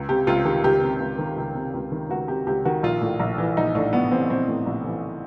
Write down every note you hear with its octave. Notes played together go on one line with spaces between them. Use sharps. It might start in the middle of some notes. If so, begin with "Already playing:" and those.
Already playing: C#2
C3 G4
C#2 F4
D#3 G4
C#2 G4
C3
C#2
D#3
C#2
C3
C#2
D#3
C#2 F#4
C3 G4
C#2 G4
D#3 F#4
A#1 F4
A2
A#1
E3
A#1 D#4
A2 D4
A#1 B3
E3 C4
A#1 C4
A2
A#1
E3